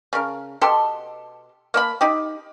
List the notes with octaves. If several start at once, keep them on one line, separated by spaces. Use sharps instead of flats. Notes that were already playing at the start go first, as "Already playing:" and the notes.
C#3 A#4
B2 G4 A4 C6
A#3 E5 B5
D#4 G4